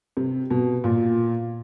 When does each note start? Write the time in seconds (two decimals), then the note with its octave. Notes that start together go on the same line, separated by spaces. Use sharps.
0.17 C3
0.50 B2
0.84 A#2